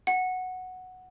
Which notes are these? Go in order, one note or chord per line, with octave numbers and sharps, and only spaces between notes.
F#5